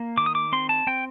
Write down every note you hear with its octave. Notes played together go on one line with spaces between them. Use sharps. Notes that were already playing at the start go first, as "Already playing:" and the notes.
Already playing: A#3
D#3 D6
D#6
D6
C4 C6
A5
C4 G5